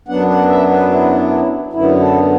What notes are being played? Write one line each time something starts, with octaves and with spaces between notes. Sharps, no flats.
F#2 F#3 B3 D4 F#5
F#5
E5
B4
E4
F#2 D3 B3 E4
A4